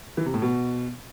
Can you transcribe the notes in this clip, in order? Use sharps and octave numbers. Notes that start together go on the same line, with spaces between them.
E3
C3
A2
B2